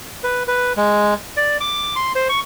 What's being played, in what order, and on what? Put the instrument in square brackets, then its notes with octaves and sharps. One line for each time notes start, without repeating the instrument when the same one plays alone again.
[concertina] B4
B4
G#3
D5
D6
C6
C5
C#6